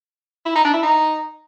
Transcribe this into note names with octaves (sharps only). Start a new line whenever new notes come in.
E4
D#4
D4
E4
D#4